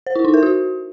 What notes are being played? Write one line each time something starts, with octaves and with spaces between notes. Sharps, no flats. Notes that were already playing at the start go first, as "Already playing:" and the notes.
C5
E4
D#4
A#4
F#4